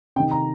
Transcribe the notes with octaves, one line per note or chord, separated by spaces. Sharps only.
C3 D#3 G5
A#5